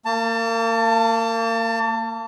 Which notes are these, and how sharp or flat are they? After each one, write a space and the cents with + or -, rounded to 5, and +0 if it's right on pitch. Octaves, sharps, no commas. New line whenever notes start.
A#3 -30 A5 +25